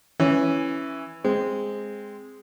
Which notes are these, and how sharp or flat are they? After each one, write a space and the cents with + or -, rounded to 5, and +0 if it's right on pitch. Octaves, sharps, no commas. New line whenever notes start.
E3 +0 C#4 +0
G#3 -5 C4 +0